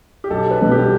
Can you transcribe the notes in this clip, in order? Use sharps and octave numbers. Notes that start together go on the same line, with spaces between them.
G4
B1 A4
B4
B2 G3 A4
G4